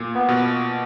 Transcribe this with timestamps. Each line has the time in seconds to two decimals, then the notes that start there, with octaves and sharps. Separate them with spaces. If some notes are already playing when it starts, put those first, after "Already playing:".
Already playing: A#2
0.15 B3
0.28 B2